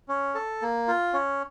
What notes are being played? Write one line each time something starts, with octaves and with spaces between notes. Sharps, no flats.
C#4
A4
A#3
F4
C#4